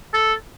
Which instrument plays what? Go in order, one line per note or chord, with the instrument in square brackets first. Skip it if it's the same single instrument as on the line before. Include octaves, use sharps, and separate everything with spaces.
[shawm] A4